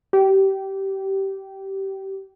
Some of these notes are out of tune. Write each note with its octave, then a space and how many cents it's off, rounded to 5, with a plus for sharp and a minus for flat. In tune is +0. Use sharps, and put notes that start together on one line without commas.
G4 -20